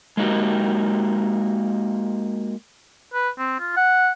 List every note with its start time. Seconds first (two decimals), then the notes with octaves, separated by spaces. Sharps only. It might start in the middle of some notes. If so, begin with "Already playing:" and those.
0.17 G#3 A#3 D#4 F#4 G4
3.14 B4
3.39 C4
3.60 F4
3.77 F#5